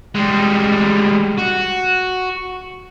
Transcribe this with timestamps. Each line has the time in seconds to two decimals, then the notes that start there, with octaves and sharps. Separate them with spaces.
0.15 G3 G#3
1.38 F#4